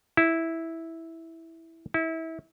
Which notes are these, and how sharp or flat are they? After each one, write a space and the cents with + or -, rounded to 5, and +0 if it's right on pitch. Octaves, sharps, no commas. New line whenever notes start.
E4 -5
E4 -25